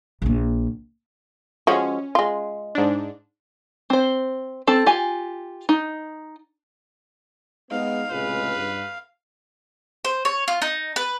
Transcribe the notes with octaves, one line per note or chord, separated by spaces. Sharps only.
A#1 A#3
F3 G#3 C#4 F#4
G#3 F4
G#2 D4
C4 C5
C4 A4 A5
F4 G4 G#5
D#4
G#3 B3 D#4 F5
C#2 A2 C3 G#3 B4
G2
C5
C#5
F4
D#4
B4